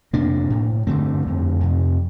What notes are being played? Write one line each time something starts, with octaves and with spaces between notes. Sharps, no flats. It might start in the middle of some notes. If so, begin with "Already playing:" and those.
F2 C3 A#3 D4
A2
G2 D3 A3 C4
F2 D3
F2 C3